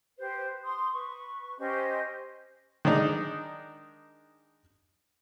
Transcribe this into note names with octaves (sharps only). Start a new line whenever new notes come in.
G4 B4 C5
C6 D#6
B4 C#6
C#4 G4 C5 D#5
D#3 G#3 D4 D#4